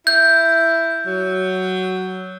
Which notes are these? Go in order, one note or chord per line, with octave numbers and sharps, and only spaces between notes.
E4 G6
F#3